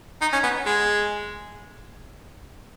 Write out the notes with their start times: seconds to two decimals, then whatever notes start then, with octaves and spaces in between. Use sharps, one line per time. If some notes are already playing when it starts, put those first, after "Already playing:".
0.21 D#4
0.33 C#4
0.43 B3
0.66 G#3